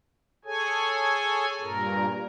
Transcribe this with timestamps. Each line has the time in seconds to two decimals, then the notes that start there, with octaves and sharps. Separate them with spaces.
0.45 G#4 A4 C#5 G#5
1.61 G2 A#2 A#4